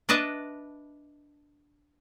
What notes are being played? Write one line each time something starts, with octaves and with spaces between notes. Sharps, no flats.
D4 B4 D#5 E5 A5